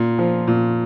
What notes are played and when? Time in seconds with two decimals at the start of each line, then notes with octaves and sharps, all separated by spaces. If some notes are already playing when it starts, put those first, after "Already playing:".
Already playing: A#2
0.18 F3
0.47 A#2